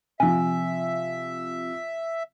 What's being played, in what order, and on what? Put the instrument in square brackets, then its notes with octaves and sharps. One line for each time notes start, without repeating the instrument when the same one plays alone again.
[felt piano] C3 F3 [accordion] E5 [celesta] G#5